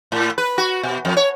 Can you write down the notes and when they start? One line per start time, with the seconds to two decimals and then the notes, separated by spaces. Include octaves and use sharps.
0.12 A2
0.38 B4
0.58 F#4
0.83 B2
1.05 F2
1.17 C#5